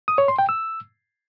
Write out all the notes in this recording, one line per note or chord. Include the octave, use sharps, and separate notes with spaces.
D#6
C#5
C6
G5
E6